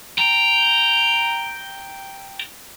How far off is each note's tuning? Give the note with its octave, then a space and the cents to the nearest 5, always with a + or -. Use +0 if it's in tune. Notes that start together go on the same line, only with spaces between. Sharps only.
G5 +0 A#5 -5